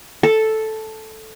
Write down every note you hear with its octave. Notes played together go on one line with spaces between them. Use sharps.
A4